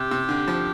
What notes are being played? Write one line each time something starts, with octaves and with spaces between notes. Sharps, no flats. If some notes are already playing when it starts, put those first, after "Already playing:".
Already playing: C3 G4
C3
D3
F3